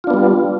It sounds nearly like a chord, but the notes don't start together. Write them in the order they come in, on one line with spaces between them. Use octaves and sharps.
F4 D4 B3 G3